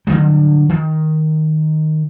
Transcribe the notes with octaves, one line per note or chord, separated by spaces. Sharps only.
D3 D#3 F#3 G3
D#3